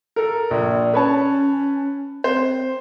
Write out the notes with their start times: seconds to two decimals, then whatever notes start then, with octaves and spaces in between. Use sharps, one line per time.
0.16 A4 A#4
0.51 A#1 D5
0.94 C#4 B4 C#5 A5
2.24 C4 C5